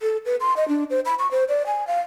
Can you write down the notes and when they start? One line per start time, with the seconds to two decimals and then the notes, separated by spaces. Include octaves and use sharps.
0.02 A4
0.26 B4
0.40 C6
0.57 D#5
0.68 D4
0.90 C5
1.06 B5
1.19 C#6
1.31 C5
1.49 D5
1.66 G#5
1.87 F5